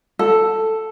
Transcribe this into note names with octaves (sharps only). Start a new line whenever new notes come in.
A4